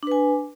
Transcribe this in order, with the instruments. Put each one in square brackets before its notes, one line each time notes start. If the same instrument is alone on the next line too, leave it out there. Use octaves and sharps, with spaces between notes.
[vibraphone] D4
B4
G#5